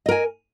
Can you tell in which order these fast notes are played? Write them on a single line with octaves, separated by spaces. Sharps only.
D#5 A#4 G#5